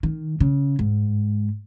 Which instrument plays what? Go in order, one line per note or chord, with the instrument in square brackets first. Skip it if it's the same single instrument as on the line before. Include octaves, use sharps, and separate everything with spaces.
[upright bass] D#3
C#3
G#2